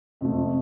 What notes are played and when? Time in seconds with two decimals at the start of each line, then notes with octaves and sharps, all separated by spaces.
0.21 F2 C3 F3 A3